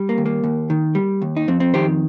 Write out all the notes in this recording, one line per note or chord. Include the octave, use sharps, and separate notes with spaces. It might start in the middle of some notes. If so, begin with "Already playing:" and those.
Already playing: G3
A#3
D#2
A#3
D#2
D#3
G3
D#2
D#4
F2 C4
C4
D#3 G4 C5